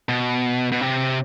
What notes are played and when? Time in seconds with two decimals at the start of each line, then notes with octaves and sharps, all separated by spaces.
0.09 B2
0.72 B2
0.81 C3